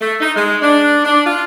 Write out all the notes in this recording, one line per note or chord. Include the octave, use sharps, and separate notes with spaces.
A3
D#4
G#3
D4
D4
F4